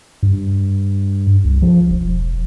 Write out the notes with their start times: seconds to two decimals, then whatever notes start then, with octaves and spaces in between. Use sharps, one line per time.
0.23 G2
1.45 C2
1.62 F3
1.91 E1